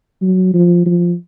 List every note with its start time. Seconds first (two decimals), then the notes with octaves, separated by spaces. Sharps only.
0.22 F#3
0.54 F3
0.86 F3